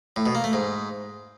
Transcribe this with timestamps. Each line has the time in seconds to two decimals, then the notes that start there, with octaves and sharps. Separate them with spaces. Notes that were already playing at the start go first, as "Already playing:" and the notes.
0.16 A2
0.26 B2
0.35 A#3
0.44 A3
0.53 G#2